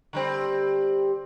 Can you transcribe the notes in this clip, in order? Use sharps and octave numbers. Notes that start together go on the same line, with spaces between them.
D3 G3 C4